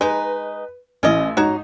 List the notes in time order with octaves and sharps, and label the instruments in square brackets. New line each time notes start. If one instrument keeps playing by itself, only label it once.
[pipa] G#3 D#4 [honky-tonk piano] B4
[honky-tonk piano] A1 E3 [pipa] C#4 D5 D#5
[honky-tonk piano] G#2 D#4 [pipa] F#4 C#5 A#5